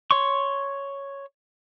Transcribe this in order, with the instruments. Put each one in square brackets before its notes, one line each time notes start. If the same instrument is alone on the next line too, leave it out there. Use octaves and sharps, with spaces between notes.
[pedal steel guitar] C#5 C6 C#6